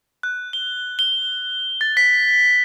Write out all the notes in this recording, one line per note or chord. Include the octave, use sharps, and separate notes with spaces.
F#6
G7
G7
A6
B6